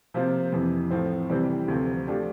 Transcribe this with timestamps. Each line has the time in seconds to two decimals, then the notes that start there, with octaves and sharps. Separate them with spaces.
0.14 C3 F3 A#3 F4 C5
0.53 F2 C3 E3
0.90 A2 F3 C4
1.30 C3 E3 G3 C4 G4
1.68 D2 C3 F3 A3
2.07 F3 A3 D4 G4